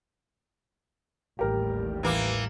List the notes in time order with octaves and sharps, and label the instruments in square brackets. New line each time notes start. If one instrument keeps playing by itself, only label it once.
[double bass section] A1 D#2 G3 [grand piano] G4 A#4
[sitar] E3 A#3